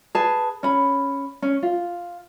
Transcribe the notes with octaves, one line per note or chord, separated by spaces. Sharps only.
G#4 B4 A5
C#4 B5
C#4
F4